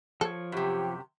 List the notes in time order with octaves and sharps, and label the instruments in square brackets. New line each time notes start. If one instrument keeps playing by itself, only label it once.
[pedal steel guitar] F3 C#5 [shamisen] A4
[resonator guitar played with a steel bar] F#2 C3 [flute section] G4